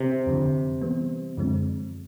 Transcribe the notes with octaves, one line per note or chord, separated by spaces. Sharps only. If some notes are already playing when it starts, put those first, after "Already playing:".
Already playing: C3
F2 D3 F3
E3 G3 B3
F#2 D3 F3 G#3 C4